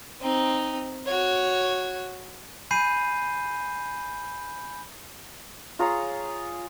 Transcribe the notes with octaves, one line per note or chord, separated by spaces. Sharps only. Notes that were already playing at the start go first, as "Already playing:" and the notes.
C4 D#4
F#4 C#5
G#5 B5 G6 C7 D#7
F4 G#4 C#5 A#5